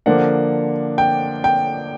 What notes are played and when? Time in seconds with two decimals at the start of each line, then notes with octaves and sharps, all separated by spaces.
0.06 D3 F3 A#3 D4 F#5
0.98 G5
1.44 G5